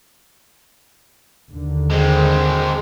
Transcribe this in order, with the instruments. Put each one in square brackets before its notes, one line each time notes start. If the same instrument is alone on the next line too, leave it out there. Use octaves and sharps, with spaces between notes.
[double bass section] D#2 D3
[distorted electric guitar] G#3 C4